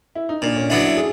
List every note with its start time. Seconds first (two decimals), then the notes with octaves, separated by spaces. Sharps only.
0.15 E4
0.29 D#4
0.42 A#2 D4
0.56 C#4
0.70 F#3 B3 D4 E4
0.84 E4
0.97 G#4